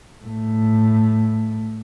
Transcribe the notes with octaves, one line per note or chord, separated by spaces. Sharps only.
A2 A3